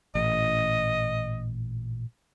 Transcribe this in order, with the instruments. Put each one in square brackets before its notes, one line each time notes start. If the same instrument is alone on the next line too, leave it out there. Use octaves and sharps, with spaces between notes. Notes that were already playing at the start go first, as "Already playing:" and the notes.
[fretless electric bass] A1 [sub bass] A#2 [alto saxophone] D#5